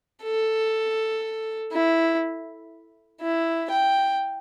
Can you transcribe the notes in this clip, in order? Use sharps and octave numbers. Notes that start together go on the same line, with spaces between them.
A4
E4
E4
G5